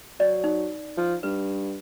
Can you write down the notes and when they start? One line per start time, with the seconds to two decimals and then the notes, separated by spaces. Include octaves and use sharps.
0.20 F#3 D5
0.44 D#4
0.98 F3
1.23 G2 B4